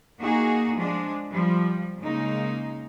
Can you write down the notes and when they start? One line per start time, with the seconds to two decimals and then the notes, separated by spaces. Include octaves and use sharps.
0.19 A#3 D#4 F#4 G#4
0.76 F3 G#3 D4
1.31 F3 G3
1.99 C#3 G#3 A#3 D#4